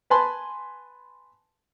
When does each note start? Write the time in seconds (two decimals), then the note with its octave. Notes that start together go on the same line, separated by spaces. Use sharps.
0.10 B4 G#5 A5 B5 C6